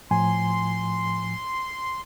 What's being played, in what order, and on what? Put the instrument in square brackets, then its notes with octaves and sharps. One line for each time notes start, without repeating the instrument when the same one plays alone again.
[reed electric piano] A2 F3 G#5 [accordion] C6